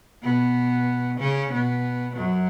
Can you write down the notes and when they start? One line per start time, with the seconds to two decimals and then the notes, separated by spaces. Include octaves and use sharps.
0.23 B2 B3
1.19 C#3 C#4
1.52 B2 B3
2.15 F#2 F#3